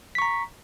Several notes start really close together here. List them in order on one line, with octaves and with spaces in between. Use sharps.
B6 C#6 A#5